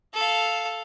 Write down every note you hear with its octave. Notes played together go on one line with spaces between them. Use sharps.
A4 F5